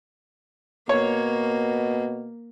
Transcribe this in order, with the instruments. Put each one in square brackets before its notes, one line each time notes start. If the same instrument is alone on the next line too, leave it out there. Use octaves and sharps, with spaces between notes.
[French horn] B2 [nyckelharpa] A#3 [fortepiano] C#5